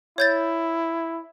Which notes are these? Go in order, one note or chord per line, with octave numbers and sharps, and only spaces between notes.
E4 C#5 G6 A6